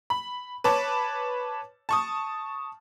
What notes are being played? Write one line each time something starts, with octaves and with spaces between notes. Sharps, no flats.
B5
B4 C#5 A5 D6
A5 C#6 D#6